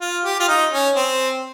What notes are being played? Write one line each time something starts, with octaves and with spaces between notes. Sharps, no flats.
F4
G4
F4
D#4
C#4
C4